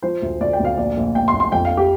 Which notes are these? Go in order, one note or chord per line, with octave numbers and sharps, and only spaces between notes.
F3 C5
D2
D2 D5
G5
D2
F5
A#1 D5
A#1
A#2 G5
C6
A#1
C6
F2 G5
F5
G4